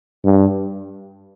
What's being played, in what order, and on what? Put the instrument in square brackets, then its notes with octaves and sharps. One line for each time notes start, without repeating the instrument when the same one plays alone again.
[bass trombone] G2